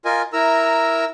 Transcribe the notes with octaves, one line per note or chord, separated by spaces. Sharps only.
F4 A#4 D#5 G#5
E4 A#4 A#5 E6